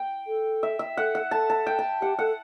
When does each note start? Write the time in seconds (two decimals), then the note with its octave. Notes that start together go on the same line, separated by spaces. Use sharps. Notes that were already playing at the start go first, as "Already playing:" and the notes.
Already playing: G5
0.27 A4
0.63 E5
0.79 E5
0.97 A4 F#5
1.15 F#5
1.31 A4 A5
1.50 A5
1.67 G5
1.79 A5
2.02 G4 F#5
2.19 A4 F#5